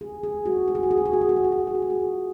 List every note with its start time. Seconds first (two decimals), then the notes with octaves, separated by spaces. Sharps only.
0.01 G#4
0.23 G#4
0.46 F#4
0.68 F#4
0.75 G#4
0.83 F#4
0.91 G#4
0.98 F#4
1.06 G#4
1.13 F#4
1.21 G#4
1.29 F#4
1.36 G#4
1.44 F#4
1.52 G#4
1.59 F#4
1.67 G#4
1.75 F#4
1.82 G#4
1.90 F#4
2.00 F4